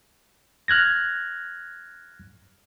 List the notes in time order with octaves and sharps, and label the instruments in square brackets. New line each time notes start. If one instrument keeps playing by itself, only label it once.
[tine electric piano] F6 F#6 G#6 A#6